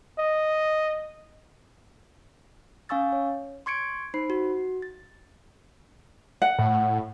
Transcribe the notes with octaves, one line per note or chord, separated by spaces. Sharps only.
D#5
C#4 F5 G#5 C#6 E6 A6
C#5
C6 C#6 G#6 C#7 D7
D#4 C5 B5 C7
F#4
A6
F#5
A2